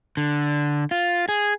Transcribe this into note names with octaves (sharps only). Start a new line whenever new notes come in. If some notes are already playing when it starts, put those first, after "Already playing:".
D3
F4
G#4